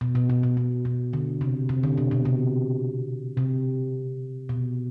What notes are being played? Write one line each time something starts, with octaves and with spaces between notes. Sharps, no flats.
B2
B2
B2
B2
B2
B2
D3
C3
C3
D3
B2
B2
C3
C3
B2